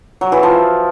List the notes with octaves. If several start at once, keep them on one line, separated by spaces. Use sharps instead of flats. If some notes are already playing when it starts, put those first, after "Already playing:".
F#3
E3
F3